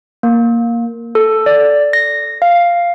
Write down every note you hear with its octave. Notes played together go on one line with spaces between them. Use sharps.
A#3
A4
D5
A#6
F5